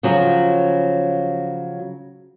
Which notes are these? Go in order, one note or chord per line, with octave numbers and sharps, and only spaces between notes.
C#3 F3 F#3 F4